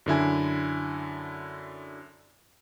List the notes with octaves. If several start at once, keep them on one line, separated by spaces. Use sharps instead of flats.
F#2 D3 E4 G#5